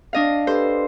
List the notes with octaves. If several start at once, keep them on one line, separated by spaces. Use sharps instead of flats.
D4 D#5 F5
G4 A4 B4 C5